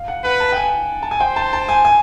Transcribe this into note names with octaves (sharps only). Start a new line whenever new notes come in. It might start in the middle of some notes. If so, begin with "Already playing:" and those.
Already playing: F5
F#5
B4 F#5
A5
G5
G#5
A5
G#5
C5 G5
A5
A5
G#5
G#5